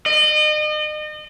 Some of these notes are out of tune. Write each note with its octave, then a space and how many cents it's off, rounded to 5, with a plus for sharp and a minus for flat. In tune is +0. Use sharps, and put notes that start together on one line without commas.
D#5 -35